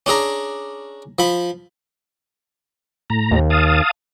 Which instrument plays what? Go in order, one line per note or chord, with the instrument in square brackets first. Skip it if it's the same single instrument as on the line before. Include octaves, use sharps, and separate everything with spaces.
[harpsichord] C#4 D4 G#4 A#5
F3 B5
[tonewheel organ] A2 A#5
[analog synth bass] D#2
[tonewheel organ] F5 A5 D#6